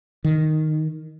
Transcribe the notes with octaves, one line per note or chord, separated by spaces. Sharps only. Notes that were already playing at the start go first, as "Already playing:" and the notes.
D#3